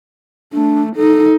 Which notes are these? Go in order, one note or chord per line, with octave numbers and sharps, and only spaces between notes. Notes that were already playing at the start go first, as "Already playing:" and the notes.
A3 D4
D#4 A4